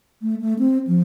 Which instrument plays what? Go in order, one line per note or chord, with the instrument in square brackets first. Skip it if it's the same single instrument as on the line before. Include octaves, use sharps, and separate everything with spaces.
[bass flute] A3
A3
C4
F3